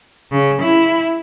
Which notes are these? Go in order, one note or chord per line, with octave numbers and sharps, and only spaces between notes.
C#3
E4